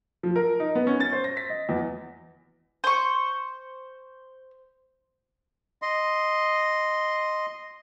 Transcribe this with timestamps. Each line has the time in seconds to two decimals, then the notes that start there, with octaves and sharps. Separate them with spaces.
0.23 F3
0.36 A#4
0.60 D#4
0.75 B3
0.87 C#4
1.00 A6
1.13 C5
1.24 A#6
1.37 B6
1.50 D#5
1.69 E2
2.84 C5 C#6
5.82 D#5 C6